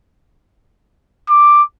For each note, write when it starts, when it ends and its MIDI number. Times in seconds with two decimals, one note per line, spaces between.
1.29 1.63 86